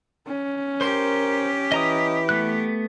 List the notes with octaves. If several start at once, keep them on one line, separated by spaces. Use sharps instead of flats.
C#4
G4 A#4 C5 C6
E3 D#5 A#5 D#6
A3 B3 F#6